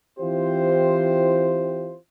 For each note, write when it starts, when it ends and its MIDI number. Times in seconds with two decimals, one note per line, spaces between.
0.19 1.96 52
0.19 1.96 60
0.19 1.96 64
0.19 1.96 65
0.19 1.96 67
0.19 1.96 72